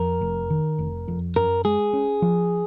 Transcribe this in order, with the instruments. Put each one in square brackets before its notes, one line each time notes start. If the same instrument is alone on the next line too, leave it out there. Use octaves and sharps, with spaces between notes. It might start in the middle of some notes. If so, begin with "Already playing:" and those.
Already playing: [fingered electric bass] F2 [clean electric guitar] A#4
[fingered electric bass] F1
D#3
F1
F2
[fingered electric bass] F#2 [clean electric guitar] A#4
[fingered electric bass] G#3 [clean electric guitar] G#4
[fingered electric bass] C#4
F3